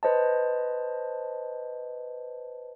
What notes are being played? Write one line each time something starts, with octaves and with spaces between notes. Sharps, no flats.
B4 C5 D#5 A5